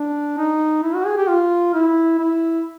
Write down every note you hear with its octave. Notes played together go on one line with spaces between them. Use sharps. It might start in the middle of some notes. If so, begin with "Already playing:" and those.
Already playing: D4
D#4
E4
F#4
G#4
G4
F4
E4
E4